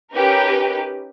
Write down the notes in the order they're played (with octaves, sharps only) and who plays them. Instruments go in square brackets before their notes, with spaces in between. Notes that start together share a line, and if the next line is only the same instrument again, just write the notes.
[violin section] C#4 D#4 G4 A#4 B4